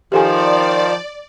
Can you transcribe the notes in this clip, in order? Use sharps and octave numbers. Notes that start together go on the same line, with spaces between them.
D#3 F3 G4 A4 D5 G#5